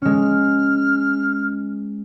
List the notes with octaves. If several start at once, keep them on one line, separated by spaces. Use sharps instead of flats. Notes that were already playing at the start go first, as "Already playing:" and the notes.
G#3 C#4 F6